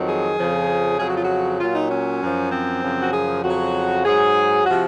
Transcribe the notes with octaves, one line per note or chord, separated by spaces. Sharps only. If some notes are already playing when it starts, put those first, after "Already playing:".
Already playing: F2 D#3 F#3
G#4
F2 C#3 F3
F2 C#3 F#3 G#4
F#4
F4
F#4
A#2 F#3 F4
D#4
C#4
F#2 F3
C4
F#2 C#3 F3
F#4
G#4
F2 C#3 F#3 F#4
G#2 F#3 G#4
C3 F3 F#4